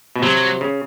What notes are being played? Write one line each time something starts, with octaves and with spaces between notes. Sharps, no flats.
B2
C3 F#3
C#3